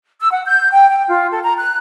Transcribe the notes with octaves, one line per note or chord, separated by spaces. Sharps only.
E6
F#5
G6
G5
G5
F4
A4
A#5
F#6